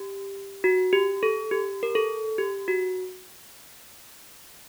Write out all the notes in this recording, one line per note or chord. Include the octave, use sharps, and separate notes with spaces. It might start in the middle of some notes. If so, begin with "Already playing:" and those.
Already playing: G4
F#4
G4
A4
G4
A#4
A4
G4
F#4